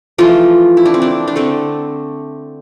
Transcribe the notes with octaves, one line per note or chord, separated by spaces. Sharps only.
E3 F3 A3 F4
E4
D4
C4
D4
D4
D3 A3 C4